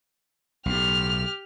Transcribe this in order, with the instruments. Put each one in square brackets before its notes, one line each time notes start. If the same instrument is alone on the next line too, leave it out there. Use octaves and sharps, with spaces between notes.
[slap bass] B1 A2 [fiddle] G4 F6